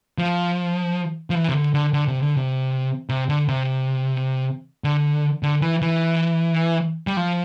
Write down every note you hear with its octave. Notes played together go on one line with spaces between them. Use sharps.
F3
F3
E3
C3
D3
D3
D3
C3
D3
C3
C3
D3
C3
D3
D3
E3
E3
G3
F3